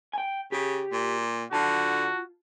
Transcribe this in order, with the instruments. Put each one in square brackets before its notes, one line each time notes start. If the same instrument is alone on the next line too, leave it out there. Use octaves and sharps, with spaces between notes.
[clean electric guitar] G5 G#5
[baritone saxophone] C#3 [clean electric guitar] G4
[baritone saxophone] A#2
[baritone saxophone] D3 [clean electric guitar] F4 A5 [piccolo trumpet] F#4